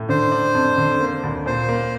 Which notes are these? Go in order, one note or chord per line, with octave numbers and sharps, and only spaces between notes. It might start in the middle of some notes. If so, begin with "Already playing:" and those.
Already playing: A2
D3 C5
D4
F2
D3
A#3
D2
A#2 C5
A#3